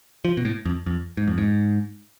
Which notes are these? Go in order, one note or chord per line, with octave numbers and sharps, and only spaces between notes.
F3
B2
A2
F2
F2
G#2
F2
G#2